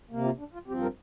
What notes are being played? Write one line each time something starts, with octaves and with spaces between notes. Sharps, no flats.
C3 A#3
F4
D4
F4
G2 F3 C4 G4
A#4